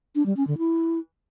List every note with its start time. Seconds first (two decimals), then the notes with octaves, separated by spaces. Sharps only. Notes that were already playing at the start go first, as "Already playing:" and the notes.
0.15 D4
0.26 G3
0.37 C#4
0.47 D3
0.58 E4